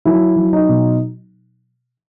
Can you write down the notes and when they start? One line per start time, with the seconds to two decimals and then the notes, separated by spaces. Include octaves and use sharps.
0.05 F#3 E4
0.36 F#3
0.53 D#4
0.69 B2